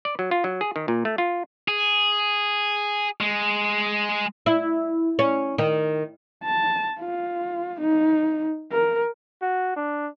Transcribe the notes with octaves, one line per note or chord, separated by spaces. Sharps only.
D5
F#3
F4
F#3
G#4
D#3
A#2
A3
F4
G#4
G#3
E4
C#4
D#3
A5
F4
D#4
A#4
F#4
D4